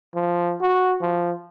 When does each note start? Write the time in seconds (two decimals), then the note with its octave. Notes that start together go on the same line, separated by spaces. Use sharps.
0.15 F3
0.61 F#4
1.01 F3